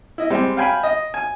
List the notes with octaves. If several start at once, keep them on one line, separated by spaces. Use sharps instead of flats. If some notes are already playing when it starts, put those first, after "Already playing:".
E4 D#5
G3 G#3 C4
F5 G5 G#5 B5
D#5
G#5